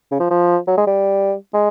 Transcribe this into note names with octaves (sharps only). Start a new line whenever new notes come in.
C#3
F3
F3
F#3
G#3
G3
G#3